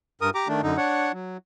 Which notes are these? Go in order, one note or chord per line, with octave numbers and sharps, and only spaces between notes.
G2 A#4 D#6
G4 A#5 D6
D#3 A3 D4
F#2 D3 D#4
D4 C#5 F#5
F#3